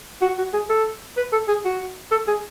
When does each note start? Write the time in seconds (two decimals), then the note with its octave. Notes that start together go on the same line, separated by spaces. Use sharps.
0.22 F#4
0.38 F#4
0.53 G#4
0.70 A4
1.17 B4
1.32 A4
1.48 G#4
1.65 F#4
2.11 A4
2.28 G#4